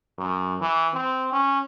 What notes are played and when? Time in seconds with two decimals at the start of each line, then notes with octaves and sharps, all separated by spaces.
0.18 F#2
0.61 E3
0.94 C4
1.32 C#4